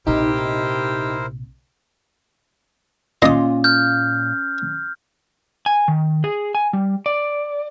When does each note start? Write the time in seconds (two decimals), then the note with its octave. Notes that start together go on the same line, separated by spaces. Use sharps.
0.07 A#1 C3 D#4 E4 G4 A#4 C5
3.22 A#2 C#4 F4 D#5 C6 D#6
3.64 F6 G6
5.66 G#5
5.88 D#3
6.24 G#4
6.55 G#5
6.73 G3
7.06 D5